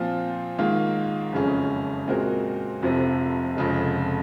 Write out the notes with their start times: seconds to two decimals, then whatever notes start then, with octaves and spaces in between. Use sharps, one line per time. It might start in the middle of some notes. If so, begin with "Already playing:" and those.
Already playing: A#2 F3 C4 F4
0.58 G#2 D#3 A#3 F4
1.32 F#1 F2 C#3 G#3 C#4
2.08 A#2 G#3 C4 F#4 A#4
2.82 F1 F2 C3 F3
3.57 F1 F2 C#3 G#3